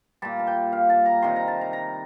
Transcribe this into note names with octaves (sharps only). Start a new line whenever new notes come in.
A#2 G3 A5
A5
G5
F5
A5
A#5
C3 D#3 G3 C6
A#5
A5
A#5
A#5